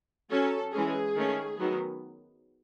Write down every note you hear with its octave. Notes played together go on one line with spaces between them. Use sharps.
F#3 C#4 A4
E3 G#3 C#4 G#4
D#3 A3 C#4
D#3 F#3 B3